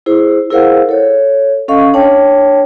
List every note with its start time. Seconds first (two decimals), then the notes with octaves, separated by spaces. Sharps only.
0.06 E4 G#4 C5
0.50 E4 G#4 A#4 C5 F5 F#5
0.89 A4 C#5
1.68 C#4 A4 D#5 F5 C#6
1.94 D4 C#5 G5 A5